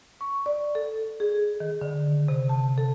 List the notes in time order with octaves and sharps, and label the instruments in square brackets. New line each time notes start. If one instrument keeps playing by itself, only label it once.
[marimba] C#6
D5
A4
G#4
D#3
D3
C3
A5
A4